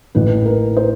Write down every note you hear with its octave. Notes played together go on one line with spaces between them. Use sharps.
A1 A2 E3 B4
A#4
C5